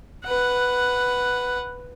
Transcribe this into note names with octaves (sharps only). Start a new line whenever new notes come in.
B4 F#5